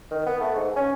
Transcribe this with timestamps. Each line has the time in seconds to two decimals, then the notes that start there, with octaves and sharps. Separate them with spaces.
0.11 D#3
0.26 B3
0.41 A3
0.55 G#2
0.76 C#4